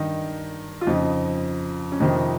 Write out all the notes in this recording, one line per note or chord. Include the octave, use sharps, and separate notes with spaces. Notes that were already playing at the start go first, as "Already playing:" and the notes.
Already playing: G2 D#3 D#4
F4
F2 C#3 F3 D#4
C#4
F2 C3 D#3 D#4